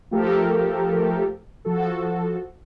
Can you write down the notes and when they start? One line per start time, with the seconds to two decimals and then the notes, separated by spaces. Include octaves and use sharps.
0.11 F3 A3 G4 A4 A#4
1.65 F3 F#4 A4